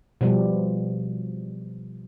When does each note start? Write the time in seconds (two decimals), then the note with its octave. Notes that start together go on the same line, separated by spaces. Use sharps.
0.21 B2 F3 G3